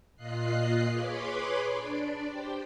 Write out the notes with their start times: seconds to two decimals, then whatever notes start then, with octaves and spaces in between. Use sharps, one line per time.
0.16 A#2 F4 D#5 F#6 C7
0.92 G#4 B4 C#5 B5 C6 D6
1.74 D4 D5
2.29 G4 C5 G5